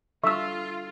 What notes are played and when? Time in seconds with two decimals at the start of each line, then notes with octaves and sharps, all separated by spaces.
0.24 G3 D4 F4 A4 E5 C#6 E6